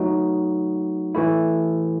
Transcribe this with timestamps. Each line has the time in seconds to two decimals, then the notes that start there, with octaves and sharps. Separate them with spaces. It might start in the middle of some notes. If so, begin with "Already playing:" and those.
Already playing: F#3 A3 D#4 F#4
1.15 E3 A3 E4